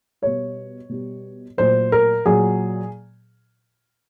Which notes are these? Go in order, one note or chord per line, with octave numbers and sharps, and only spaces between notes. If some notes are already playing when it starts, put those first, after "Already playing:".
B2 G3 C#5
B2 G3
A#2 F#3 C5
A#4
A#2 F#3 G#4